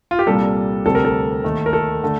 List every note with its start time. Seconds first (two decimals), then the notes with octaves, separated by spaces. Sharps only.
0.11 F4
0.19 G4
0.26 C2 A#2 G3 A#3 A4
0.86 D2 C3 G3 A4
0.95 A#4
1.05 A4
1.44 D#2 D#3 A3
1.66 A#4
1.73 A4
2.03 D3 A3